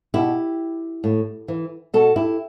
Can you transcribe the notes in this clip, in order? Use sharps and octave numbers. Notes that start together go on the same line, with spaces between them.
B2 E4 G4
A2
E3
B2 F#4 A4
E4 G4